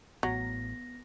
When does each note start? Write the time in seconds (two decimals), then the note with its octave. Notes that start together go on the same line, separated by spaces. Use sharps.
0.23 A1 A2 F#3 B3 A#6